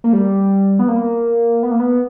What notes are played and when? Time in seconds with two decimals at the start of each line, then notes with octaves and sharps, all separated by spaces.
0.04 A#3
0.13 G3
0.79 B3
0.88 A#3
1.63 B3
1.71 A#3
1.80 B3